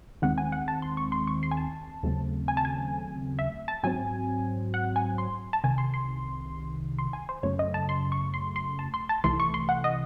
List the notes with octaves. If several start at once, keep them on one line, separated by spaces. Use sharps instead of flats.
D#2 D#3 G#3 C4 F#5
G#5
F#5
A5
C6
C#6
C6
C#6
C6
G#5
A5
D#2 C#3 F#3 A3 C4
G#5
A5
G#5
E5
A5
G#2 F#3 C4 G#5
F#5
G#5
C6
A5
C2 C3 D#3 G#5
C6
C6
C6
G#5
C5
F#2 C#3 F#3 A3 C#5
D#5
A5
C6
C#6
C6
C6
A5
C6
A5
C2 C3 E3 A3 C6
C#6
C6
F#5
D#5